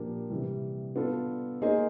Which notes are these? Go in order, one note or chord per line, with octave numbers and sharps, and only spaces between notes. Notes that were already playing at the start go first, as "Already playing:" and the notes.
Already playing: A#2 F3 A#3 D4 G4
C3 E3 G3
B3 D4 F4 A4
A#3 D#4 G#4 C5 D#5